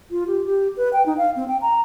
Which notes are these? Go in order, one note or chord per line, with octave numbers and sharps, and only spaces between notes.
F4
G4
G4
B4
G5
D#4
F5
C4
G5
A#5